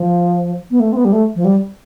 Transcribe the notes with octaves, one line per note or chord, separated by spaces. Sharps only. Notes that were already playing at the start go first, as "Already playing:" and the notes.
Already playing: F3
B3
A3
C4
B3
G3
A3
F3
G3